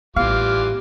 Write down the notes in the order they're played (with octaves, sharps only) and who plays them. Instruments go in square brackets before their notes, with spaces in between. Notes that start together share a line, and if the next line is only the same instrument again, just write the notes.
[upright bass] A1 B3 [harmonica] E3 F4 D6 [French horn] G3 [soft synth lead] F5